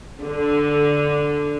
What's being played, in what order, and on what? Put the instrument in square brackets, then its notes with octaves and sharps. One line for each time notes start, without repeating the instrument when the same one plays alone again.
[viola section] D3